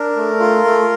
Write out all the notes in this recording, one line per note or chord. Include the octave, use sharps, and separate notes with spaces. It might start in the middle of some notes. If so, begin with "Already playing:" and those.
Already playing: D4 A#4
A3
F4
A3